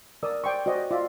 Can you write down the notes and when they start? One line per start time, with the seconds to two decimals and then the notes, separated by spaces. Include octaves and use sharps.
0.23 A#4 D5 D#6 E6
0.44 D5 G5 C6 C#6
0.66 F#4 C5 D5 D#5 G5
0.91 F4 D5 E5